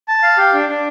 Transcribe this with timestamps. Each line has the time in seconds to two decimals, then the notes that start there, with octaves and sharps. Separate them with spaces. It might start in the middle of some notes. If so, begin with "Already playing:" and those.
0.08 A5
0.23 F5
0.38 G4
0.54 D4
0.69 D4